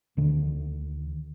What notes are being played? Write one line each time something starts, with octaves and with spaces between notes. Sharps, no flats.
D2 D3 D#3